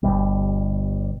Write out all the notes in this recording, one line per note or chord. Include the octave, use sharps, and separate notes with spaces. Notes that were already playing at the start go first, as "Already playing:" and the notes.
G1 D#2 B2 G3